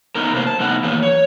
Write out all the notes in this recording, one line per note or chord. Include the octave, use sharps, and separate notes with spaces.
B3 D#4 A#4
C3 A3 A#3 C5
A5
A2 C3 B3 D#4 F#5
D#3 E3 A#3 G#4 B4
C#5